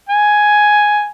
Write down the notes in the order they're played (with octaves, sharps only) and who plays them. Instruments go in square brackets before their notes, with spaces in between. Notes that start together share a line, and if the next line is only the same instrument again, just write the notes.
[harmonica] G#5